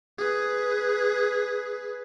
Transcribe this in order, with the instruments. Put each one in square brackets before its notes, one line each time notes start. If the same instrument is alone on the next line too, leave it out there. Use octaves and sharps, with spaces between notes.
[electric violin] G#4 B4